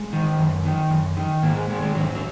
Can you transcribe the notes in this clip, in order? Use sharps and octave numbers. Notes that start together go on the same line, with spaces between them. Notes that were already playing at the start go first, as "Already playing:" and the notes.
Already playing: G#3
D#3
F#2
D#3
F#2
D#3
G#2 A#3
G#3
D#3 G#3
G#3
G#2 F#3
F#3